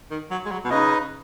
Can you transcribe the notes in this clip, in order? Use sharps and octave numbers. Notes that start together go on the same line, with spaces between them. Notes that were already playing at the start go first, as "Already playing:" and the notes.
D#3
F#3
G#3
F#3
B2
C#3 D#4 B4 D#5